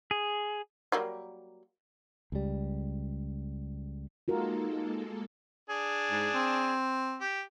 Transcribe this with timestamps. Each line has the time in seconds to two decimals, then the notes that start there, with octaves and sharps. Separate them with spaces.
0.11 G#4
0.92 F#3 G3 A#3
2.32 C#2 G3
4.28 G#3 A#3 D#4 F4 F#4 A4 A#4
5.70 D4 G#4
6.11 G#2
6.34 C4
7.21 G4